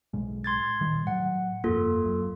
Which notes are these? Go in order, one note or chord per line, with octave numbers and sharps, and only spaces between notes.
B1 A2 G#3
C6 G#6 A6
A#2 D#3 G3
A2 F#3 F#5
G1 F2 A#3 F4 A4
F#2